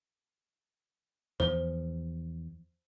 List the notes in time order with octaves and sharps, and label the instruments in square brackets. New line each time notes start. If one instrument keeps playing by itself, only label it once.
[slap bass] E2 F3 [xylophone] C5